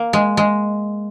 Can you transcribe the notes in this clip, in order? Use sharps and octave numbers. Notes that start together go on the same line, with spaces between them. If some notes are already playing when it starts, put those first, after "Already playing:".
Already playing: A#3
G#3
G#3